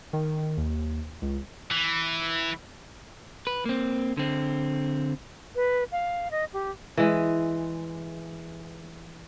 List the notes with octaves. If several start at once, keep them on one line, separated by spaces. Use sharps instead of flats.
D#3
D#2
C#2
E3
B4
A#3 C4
D3 C4
B4
F5
D#5
G4
E3 G#3